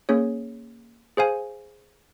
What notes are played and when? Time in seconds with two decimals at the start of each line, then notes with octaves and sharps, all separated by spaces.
0.09 A#3 C#4 G#4 C#5
1.17 G#4 C5 F5 G#5